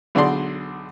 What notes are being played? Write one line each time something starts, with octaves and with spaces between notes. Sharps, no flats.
B1 D3 G#4 D5 C6